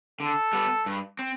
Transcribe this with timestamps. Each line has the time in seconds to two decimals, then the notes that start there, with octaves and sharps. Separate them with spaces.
0.20 D3 A4
0.53 G3 B3
0.86 G2
1.19 C4